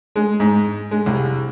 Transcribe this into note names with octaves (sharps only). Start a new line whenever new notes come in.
G#3
G#2
G#3
C2